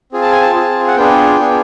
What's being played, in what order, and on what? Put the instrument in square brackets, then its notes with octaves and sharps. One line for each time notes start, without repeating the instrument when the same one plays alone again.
[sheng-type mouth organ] C4 F4 G#4
A5
G#5
A5
C4 F4 G#4
F#5
B3 D4 F4 G#4 G5
B3 D4 F4 G#4